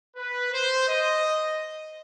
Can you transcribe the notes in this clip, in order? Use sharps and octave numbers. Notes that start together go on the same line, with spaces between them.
B4
C5
D#5